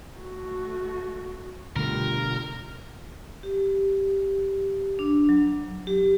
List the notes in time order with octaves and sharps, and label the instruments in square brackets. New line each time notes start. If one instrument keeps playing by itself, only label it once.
[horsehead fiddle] A3 F#4
[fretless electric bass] B2 D3 A3 [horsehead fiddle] G3 F4 [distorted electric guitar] A#4
[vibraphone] G4
D4
F#3
G4